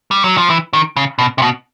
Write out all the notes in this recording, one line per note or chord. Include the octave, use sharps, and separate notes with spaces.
G3
F#3
F3
E3
D#3
C#3
B2
C3
B2